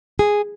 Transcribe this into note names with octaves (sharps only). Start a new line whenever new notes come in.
G#4